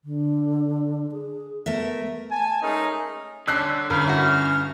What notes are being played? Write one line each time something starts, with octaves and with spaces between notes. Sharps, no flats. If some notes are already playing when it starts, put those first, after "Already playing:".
D3
G#4
A3 B3 A#4 E5
G#5 A5
G#3 A3 C#4 D#4 G#4 A#4
D3 G3 C#4 D4 E6 F#6 C7
G1 C#4 A#4 B5 F6
E4 F#4